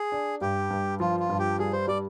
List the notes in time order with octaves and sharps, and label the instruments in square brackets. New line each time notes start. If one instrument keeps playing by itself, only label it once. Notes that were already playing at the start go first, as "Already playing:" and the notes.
Already playing: [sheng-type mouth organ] G#4
[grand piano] D4
[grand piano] G2 [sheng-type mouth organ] G4
[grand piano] G2
[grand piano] F3 [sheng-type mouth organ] F4
[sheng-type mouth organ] F4
[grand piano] G2
[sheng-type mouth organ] G4
[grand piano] G3 [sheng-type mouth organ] G#4
[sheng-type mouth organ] C5
[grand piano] G3 [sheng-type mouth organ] D5